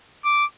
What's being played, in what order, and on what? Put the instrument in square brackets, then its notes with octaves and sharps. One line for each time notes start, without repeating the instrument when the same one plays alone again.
[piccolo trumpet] D6